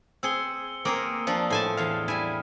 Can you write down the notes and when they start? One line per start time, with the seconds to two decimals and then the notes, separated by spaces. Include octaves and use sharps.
0.23 C4 G#4 E6 C#7 G7
0.85 A#3 C4 G#4 A#4 D#6 D7
1.27 F3 D4 C7
1.50 A2 C5 G#5 A5
1.77 E2 F5 F6
2.08 G3 E4 G#5